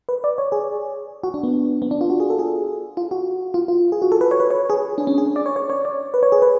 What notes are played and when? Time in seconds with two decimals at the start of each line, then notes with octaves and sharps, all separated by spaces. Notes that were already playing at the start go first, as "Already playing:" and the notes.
0.09 B4
0.24 D5
0.38 C#5
0.52 G#4
1.23 F#4
1.34 D4
1.43 B3
1.82 B3
1.91 D4
2.01 F4
2.10 F#4
2.20 G#4
2.30 A4
2.39 G#4
2.97 F4
3.11 F#4
3.54 F4
3.68 F4
3.92 G#4
4.02 F#4
4.12 A4
4.21 B4
4.31 C#5
4.40 B4
4.51 C#5
4.70 G#4
4.98 D4
5.07 C#4
5.18 G#4
5.36 D5
5.46 C#5
5.56 C#5
5.70 C#5
5.85 D5
6.14 B4
6.23 C#5
6.32 G#4
6.42 B4